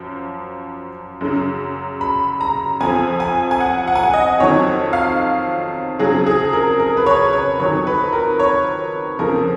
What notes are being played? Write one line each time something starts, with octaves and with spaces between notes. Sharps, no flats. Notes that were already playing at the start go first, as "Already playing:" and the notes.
Already playing: F#2 F3
F#2 C#3 F#3
B5
A#5
F2 F3 G#5
G#5
G#5
F#5
F#5
G#5
F#5
D#5
F2 D#3 F#3 C#5
F5
F2 C#3 F#3 G#4
G#4
A#4
A#4
B4
C#5
C#5
F2 D#3 F#3 C#5
B4
A#4
C#5
F2 C#3 F3 A#4